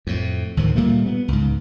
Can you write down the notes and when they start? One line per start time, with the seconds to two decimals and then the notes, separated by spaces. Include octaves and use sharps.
0.07 F2 A2
0.57 D2 A2 D#3 F3
0.75 A#2 G3 A3 A#3
1.06 B3
1.28 C#2 G#2